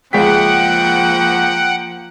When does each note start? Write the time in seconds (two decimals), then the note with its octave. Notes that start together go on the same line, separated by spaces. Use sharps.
0.13 C#2 F3 A#3 G#4 F#5 G5 B6